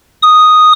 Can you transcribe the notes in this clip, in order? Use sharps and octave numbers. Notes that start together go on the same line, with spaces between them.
D#6